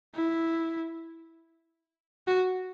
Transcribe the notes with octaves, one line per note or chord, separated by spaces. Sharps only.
E4
F#4